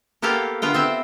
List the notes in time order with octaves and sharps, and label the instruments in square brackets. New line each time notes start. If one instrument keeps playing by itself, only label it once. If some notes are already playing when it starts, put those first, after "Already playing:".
[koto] A#3 B3 G4 A4 F5
D3 B3 F4 G5
B3 C4 C5 E5